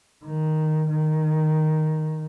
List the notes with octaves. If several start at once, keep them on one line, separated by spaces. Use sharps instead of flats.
D#3
D#3